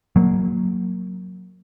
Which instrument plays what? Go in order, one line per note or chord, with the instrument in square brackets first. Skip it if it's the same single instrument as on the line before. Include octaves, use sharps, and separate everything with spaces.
[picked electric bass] F#3 A#3